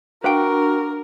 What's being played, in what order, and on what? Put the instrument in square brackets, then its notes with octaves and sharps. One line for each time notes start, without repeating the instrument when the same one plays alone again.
[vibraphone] D4 [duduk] F#4 [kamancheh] A#4 [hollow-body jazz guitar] B4 F5 G5